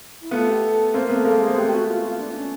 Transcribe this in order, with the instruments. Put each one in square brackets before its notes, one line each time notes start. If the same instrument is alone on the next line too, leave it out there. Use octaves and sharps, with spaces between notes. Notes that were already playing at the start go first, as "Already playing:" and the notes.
[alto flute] E4
[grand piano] A3 B3 [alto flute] F4
[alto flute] G4
A4
[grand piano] A#3 C4 [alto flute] A#4
[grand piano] A3 B3
[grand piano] G#3 A#3 [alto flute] A4
[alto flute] G#4
[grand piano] C4
[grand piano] A3 B3 [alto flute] G4
[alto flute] F#4
F4
F4
D4
C#4